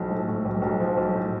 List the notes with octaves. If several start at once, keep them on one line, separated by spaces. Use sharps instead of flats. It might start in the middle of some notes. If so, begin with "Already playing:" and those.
Already playing: B1 A2 F3
A2
A2
B1
B1
F3
B1
A2